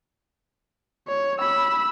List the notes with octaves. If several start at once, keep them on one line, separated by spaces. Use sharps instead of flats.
C#5
B5 E6